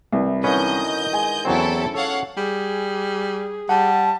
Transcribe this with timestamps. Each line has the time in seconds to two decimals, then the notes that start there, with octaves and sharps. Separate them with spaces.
0.12 C2 E3
0.44 D3 D#3 F#3 C#4 B4 D#5 G6
1.13 G#3 G#5
1.45 E2 F#3 C4 C#4 E4 F#4 A4
1.94 A4 C#5 F5 F#5
2.37 G3 G#4
3.69 G3 F#5 A5